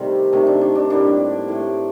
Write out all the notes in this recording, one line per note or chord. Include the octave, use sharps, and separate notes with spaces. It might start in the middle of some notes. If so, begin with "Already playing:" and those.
Already playing: C3 D#3 G3 A3 C4
C3 D#3 A3
D4
D4
D4
A2 G3 A#3 D4
A2 A3